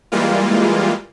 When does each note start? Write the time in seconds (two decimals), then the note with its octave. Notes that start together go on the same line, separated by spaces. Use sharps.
0.12 E3 G3 G#3 A#3 F4